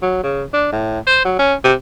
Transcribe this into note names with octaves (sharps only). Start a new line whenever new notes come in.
F#3
C#3
D4
A2
C5
F#3
C#4
C3